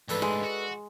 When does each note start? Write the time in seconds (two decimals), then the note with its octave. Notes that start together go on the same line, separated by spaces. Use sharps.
0.09 D2 G#2 D4 A4 B4
0.22 G#3
0.44 F#4